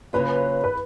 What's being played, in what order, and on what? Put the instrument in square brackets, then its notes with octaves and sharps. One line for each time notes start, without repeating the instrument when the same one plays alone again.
[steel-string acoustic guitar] C#3 F#3 A#3 C#4 F4 [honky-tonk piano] B4
[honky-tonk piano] B4